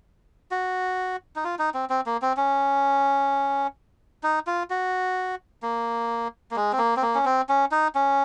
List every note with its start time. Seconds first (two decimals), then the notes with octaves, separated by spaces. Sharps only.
0.51 F#4
1.36 D#4
1.44 F4
1.59 D#4
1.74 C4
1.90 C4
2.06 A#3
2.22 C4
2.37 C#4
4.23 D#4
4.47 F4
4.70 F#4
5.63 A#3
6.51 A#3
6.56 G#3
6.73 C4
6.78 A#3
6.97 C4
7.02 A#3
7.15 C#4
7.25 C4
7.49 C#4
7.72 D#4
7.95 C#4